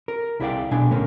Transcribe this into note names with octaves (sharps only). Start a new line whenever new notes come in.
A#4
C2 E4 G#4 D5 F5 G5
B1 B2 D4 G#5
A2 D3 A3 A#3 C#4